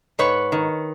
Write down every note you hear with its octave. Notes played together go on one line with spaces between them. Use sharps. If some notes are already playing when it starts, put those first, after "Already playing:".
G#2 B4 C#5
D#3